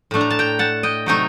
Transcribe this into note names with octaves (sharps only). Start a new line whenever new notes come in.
A2 A3 D4
A#5
A5
G5 A#5
F#5 A5
D#5 G5
C3 F#3 A3 D#4 G5 A#5